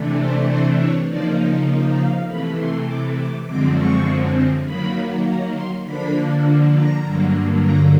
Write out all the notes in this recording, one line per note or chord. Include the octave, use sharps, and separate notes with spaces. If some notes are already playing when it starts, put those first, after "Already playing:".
Already playing: C3 E3 A3 D4
C5
C5
C#5
C#3 F3 A#3 D#4 D5
F5
C3 E3 A3 B5
C6
D6
D6
F#2 D3 F3 G#3 C4 D6
C#6
D#3 F#3 A#3 B5
A#5
C6
D3 F3 A#3 D4 B5
A#5
G2 D3 F#3 A#3
A#5